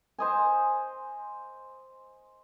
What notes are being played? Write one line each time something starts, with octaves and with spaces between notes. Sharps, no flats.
C5 D#5 G#5